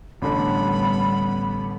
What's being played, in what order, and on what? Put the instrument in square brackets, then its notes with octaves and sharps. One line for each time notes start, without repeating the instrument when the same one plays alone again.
[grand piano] A1 D3 [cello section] G3 B3 [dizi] B5